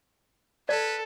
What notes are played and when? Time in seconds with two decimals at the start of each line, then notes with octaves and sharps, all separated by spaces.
0.69 A4 B4 D5